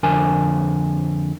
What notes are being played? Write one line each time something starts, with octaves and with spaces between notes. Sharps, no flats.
F2 D3 A#4 G#5